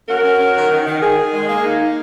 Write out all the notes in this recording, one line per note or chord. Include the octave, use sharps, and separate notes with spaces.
C#4 F#4 A#4
C#4
C#4
D#3
D#3
D#3
D#3 G#4
D#3
G#3
A#3
D#4
A#3